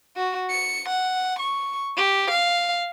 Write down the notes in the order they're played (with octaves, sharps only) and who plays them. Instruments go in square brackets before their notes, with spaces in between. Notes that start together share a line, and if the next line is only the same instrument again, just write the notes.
[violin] F#4
C#7
F#5
C#6
G4
F5